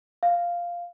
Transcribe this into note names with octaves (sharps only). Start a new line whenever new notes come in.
F5